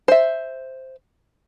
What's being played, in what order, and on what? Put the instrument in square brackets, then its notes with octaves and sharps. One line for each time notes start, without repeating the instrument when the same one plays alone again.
[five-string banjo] C5 E5